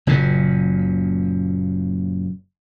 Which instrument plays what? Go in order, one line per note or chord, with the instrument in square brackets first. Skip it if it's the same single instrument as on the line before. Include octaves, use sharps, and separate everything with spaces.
[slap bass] F#1 F#2 A#2 C#3